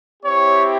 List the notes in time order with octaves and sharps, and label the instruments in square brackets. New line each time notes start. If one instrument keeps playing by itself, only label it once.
[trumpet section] C4 E4 G4 C#5